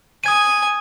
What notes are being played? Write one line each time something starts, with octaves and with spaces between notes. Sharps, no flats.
G#5 D#6 G#6 D#7